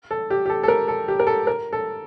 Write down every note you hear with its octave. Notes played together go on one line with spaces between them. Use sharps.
A4
G4
G4
A4
A4
A#4
A4
G4
A#4
A4
A#4
A4